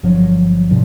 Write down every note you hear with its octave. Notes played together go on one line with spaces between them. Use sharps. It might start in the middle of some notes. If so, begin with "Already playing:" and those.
G1 G2 F3 F#3
G#2 C3 F3 G3